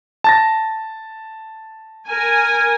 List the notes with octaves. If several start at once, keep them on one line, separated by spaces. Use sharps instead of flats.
A5 A6 A#6
A#4 G#5